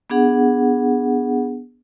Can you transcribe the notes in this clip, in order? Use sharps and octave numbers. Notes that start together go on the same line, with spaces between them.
B3 D4 G#4 F#5